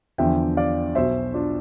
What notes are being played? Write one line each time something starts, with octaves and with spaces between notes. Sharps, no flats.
E2 D3 F3 E5 G5
D5 F5
B1 B2 C5 E5
D4 F4